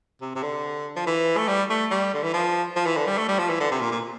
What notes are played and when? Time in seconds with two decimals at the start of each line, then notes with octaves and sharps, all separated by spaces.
0.21 C3
0.36 C3
0.42 D3
0.96 F3
1.06 E3
1.37 A3
1.48 G3
1.70 A3
1.91 G3
2.14 D3
2.23 E3
2.33 F3
2.76 F3
2.86 E3
2.97 D3
3.07 G3
3.18 A3
3.28 G3
3.39 F3
3.49 E3
3.60 D3
3.71 C3
3.81 A#2
3.91 A#2